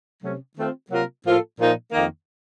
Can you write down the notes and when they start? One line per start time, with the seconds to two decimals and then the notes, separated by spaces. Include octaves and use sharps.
0.21 C3 F#3 A3 C#4
0.55 D#3 A3 C4 F4
0.90 C3 F#3 A#3 F4 A#4
1.24 A2 F3 A#3 F4 A4
1.58 A#2 F3 A#3 D#4
1.92 F2 D#3 A#3